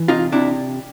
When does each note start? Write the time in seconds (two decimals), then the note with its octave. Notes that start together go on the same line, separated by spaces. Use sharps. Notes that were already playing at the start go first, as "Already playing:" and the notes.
Already playing: E3
0.08 C3 D#4 F4
0.32 C3 D4 E4